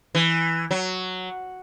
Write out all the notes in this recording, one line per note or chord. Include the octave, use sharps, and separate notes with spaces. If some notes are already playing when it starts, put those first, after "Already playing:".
E3
F#3